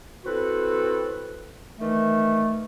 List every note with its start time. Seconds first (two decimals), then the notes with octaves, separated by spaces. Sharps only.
0.24 C4 E4 F#4 A4 B4
1.79 D#3 E3 A3